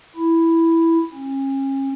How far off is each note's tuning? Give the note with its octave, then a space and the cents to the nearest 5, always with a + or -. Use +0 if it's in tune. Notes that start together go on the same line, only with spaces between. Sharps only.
E4 +0
C#4 -35